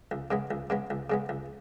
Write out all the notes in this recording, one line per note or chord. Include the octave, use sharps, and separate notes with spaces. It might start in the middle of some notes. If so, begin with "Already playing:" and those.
C#2
C#3 G#3 B3
C#2
C#3 G#3 B3
C#2
C#3 G#3 B3
C#2